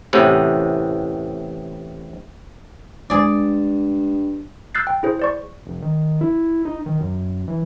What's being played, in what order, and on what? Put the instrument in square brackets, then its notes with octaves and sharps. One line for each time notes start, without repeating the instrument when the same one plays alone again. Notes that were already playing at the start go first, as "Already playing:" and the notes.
[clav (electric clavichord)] A1 A2 C3 E3 B3
[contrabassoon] G2 [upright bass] G#3 [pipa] G#4 D5
[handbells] E6 F#6 G6 A6 C7
G5
E4 G#4 C5
C5 D5 C#6
[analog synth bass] F1
D#3
E4
D#4
D#3
F#2
E3